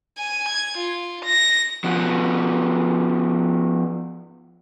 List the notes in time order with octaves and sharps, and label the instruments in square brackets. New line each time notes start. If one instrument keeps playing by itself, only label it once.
[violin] G#5
G#6
F4
A#6
[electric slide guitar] F3 B3 F#4